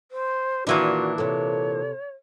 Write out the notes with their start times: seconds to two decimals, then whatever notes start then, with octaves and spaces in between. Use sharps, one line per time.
0.11 C5
0.67 A#2 D#3 E3 A#3 D4 E4 F#4
1.18 C3 A4 C#5